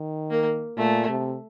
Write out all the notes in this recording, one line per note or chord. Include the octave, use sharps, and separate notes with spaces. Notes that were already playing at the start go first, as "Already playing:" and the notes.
Already playing: D#3
A#3
A#2 A3
C3